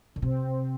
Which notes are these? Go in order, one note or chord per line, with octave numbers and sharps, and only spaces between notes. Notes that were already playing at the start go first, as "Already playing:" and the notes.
D3
C3 C4